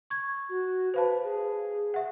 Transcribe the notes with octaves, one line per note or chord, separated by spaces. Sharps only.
C#6 G#6
F#4
B4 C5 F5 A5
G#4
E5 F#5